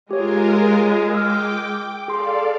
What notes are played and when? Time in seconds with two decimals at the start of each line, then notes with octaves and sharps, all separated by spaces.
0.11 G#3 F4 G4 A#4 C#5
1.15 G5 D6 E6 F6
2.08 G#4 A4 D5 F5 C6